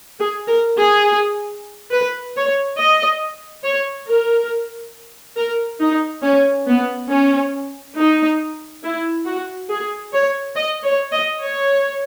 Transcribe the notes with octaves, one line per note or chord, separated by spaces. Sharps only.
G#4
A#4
G#4
B4
C#5
D#5
C#5
A#4
A#4
D#4
C#4
B3
C#4
D#4
E4
F#4
G#4
C#5
D#5
C#5
D#5
C#5